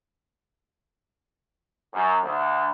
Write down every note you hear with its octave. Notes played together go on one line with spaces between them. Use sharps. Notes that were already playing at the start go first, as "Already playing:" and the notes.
F#2
D2